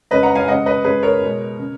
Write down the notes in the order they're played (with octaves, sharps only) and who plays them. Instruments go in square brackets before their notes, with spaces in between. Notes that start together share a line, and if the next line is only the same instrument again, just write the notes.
[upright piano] C#3 G#3 B4 D#5
F#5 A#5
F5 G#5
C#3 G#3 D#5 F#5
B4 D#5
C#3 G#3 G#4 B4
A#4 C#5
B2 G#3
C#3